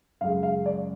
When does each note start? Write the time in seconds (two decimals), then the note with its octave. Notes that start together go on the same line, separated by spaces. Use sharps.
0.21 F#2 C#3 G#3 F5
0.43 F5
0.66 D5